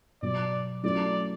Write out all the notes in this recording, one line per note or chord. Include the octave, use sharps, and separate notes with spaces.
B2 F#3 B3 D5
F#3 A3 C#4 E4 D5